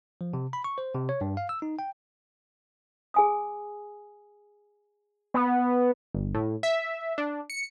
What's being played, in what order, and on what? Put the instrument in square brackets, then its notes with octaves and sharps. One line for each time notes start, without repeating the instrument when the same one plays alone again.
[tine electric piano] F3
C3
B5
C#6
C5
C3
C#5
G2
F5
E6
D#4
G5
[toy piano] G#4 G#5 D#6
[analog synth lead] B3
[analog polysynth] G1
A2
E5
D4
C#7